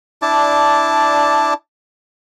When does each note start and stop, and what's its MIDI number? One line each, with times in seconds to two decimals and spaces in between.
0.22 1.54 62
0.22 1.54 64
0.22 1.54 74
0.22 1.54 81